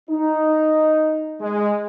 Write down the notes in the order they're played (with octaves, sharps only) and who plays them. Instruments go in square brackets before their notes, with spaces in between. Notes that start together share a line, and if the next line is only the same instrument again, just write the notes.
[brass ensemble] D#4
G#3